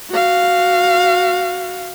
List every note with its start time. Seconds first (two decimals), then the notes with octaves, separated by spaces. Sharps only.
0.10 F#4 F5